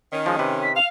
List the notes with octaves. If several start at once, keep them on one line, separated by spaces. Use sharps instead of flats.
D#3 C#4
F3 G#3
C3 B4
B6
F5 F7